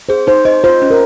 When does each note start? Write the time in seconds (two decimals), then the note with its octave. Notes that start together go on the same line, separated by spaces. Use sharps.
0.09 G#4 C5
0.27 D#4 C5
0.45 C5 D#5
0.64 F4 C5
0.82 C#4
0.90 A#4